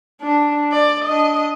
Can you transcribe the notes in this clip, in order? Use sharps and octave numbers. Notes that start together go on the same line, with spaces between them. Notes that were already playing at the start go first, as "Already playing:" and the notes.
D4
D5
D4 D#5